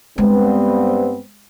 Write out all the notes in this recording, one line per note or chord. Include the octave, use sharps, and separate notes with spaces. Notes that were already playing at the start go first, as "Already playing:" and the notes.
G2 G#3 B3 C4